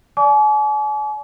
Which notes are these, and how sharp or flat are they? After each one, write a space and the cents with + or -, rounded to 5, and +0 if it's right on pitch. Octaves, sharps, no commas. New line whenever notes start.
D5 -15 G#5 +40 D6 -40